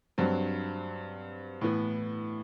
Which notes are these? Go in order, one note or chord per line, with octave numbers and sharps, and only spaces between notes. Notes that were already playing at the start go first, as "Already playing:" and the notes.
G2 F#3 C4
A2 E3 B3